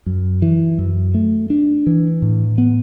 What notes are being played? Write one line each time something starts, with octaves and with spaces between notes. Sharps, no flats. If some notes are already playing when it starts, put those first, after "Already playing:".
F#2
E3
F#2
A3
D4
E3
A2
B3